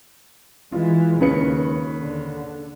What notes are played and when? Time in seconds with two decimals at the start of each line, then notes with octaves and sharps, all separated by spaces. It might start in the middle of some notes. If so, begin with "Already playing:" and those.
0.72 E3 G#3 F4
1.21 D#2 C#3 B4 C#7
2.00 D3